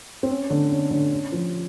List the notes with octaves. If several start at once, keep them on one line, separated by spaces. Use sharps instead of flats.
C4
C#4
D3 D4
C#4
D3 D4
C#4
F3 F4